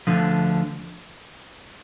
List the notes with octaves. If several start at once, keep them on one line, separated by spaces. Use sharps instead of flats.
D2 D3 F3